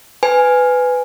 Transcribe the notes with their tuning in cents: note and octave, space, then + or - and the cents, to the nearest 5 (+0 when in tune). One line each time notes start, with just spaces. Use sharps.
B4 +15 G#5 +0